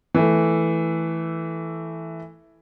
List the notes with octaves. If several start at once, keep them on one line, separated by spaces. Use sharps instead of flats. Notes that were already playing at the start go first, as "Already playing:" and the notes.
E3 A3